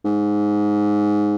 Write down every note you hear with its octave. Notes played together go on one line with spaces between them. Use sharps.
G#2